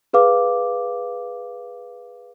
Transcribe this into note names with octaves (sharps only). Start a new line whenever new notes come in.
G#4 B4 F5 D6